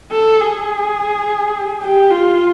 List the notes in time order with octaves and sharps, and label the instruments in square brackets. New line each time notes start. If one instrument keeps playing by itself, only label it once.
[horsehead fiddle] A4
G#4
G4
F4